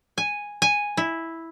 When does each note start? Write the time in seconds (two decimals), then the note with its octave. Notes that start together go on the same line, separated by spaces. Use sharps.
0.18 G#5
0.62 G#5
0.97 E4